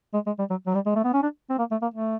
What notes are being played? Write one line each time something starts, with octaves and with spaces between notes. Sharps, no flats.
G#3
G#3
G3
F#3
F#3
G3
G#3
A3
B3
C#4
D4
C4
A#3
A3
A#3
A3